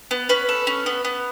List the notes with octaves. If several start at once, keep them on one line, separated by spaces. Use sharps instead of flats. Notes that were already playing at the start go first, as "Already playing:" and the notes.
B3
C#4 B4
A4
C#4
B3
B3